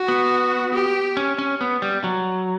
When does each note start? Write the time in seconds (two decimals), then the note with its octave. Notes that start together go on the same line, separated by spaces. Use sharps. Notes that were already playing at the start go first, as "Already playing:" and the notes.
Already playing: F#4
0.08 B3
0.74 G4
1.17 C#4
1.38 C#4
1.61 B3
1.82 G3
2.04 F#3